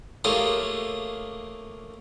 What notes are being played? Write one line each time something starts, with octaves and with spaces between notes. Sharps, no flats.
A3 A#3 F4 G4 G#4 C#5